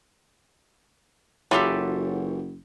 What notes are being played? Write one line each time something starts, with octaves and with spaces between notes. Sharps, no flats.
F#1 E3 F#3 F4 G4 A4